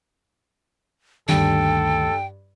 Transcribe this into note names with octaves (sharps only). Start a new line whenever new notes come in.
D2 G2 D#3 A4 G5